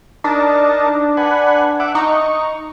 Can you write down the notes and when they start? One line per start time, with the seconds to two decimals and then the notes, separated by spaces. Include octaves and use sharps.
0.24 D4 D#4 A#4 A5
1.17 B4 F#5 G#5
1.80 E5 F#5 D6
1.95 D#4 C#6